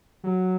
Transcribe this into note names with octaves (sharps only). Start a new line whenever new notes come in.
F#3